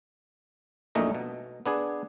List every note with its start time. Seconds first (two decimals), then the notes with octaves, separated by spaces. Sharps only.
0.95 A#1 F#2 A#2 A3 D#4 D#5
1.15 B2
1.66 B3 D4 G#4